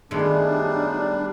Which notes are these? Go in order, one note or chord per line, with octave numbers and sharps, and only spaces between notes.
F#2 A2 D#3 G3 G#3 B3 D4 D#4